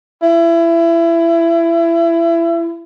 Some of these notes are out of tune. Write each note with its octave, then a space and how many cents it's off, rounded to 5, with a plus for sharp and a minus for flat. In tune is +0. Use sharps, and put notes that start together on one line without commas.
E4 +25